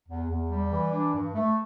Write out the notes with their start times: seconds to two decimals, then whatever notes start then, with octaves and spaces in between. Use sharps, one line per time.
0.08 E2
0.29 E2
0.50 G3
0.72 E3
0.92 D4
1.14 G2
1.34 A3